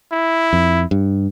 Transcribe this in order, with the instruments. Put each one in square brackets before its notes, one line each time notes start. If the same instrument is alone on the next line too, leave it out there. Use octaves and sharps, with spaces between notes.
[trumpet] E4
[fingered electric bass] F2
G2